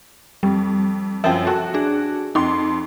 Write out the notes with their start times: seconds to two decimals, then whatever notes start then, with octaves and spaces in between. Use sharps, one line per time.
0.43 F2 G3
1.24 F#2 F3 E5 G5
1.46 F#4 A4
1.74 D4 G#4
2.35 F2 D#4 C6